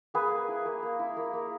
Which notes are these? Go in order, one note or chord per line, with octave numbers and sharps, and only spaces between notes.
A#3 G#4 B4
A#3
E4
A#3
A#3
E4
A#3
A#3